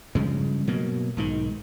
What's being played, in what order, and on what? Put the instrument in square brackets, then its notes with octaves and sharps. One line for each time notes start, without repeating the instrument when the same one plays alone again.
[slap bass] G2 C#3 F3 G#3
B2 F#3 A#3
B1 G#2 D#3